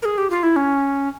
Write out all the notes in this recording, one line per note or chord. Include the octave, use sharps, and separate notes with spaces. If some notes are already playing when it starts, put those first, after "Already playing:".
A#4
G#4
G4
F4
E4
C#4